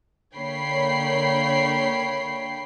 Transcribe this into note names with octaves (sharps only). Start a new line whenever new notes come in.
D3 A#3 C#5 G5 B5 C7